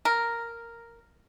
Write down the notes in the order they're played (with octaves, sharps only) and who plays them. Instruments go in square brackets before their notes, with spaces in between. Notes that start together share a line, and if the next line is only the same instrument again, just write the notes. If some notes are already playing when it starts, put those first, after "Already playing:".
[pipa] A#4